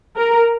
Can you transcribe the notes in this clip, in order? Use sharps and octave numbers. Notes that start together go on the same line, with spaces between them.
A#4